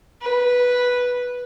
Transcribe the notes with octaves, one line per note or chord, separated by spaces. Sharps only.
B4